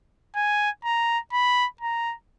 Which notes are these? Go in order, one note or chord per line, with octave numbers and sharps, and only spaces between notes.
G#5
A#5
B5
A#5